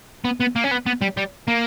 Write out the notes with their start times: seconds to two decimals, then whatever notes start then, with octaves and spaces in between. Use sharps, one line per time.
0.25 B3
0.40 B3
0.56 A#3
0.64 C#4
0.71 B3
0.86 B3
1.02 G3
1.17 G3
1.48 A#3